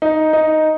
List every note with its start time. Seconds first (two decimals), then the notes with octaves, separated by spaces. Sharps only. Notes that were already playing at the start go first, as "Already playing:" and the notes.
0.02 D#4
0.33 D#4